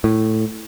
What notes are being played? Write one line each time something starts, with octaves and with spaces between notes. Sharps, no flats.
A2